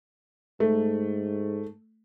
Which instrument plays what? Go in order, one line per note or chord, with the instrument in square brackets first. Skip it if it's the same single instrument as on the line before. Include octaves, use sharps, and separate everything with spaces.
[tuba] G#2 [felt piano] A3